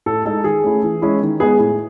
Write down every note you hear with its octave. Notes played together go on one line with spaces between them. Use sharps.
A2 A4
G#3 D#4 A4
D#3 G#4
A3 C#4 E4
E3
G#3 C#4 E4
D#3
G#3 B3 G#4
A2